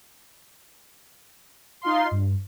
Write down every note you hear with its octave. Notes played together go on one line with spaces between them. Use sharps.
D#4 F4 F5 C6
G2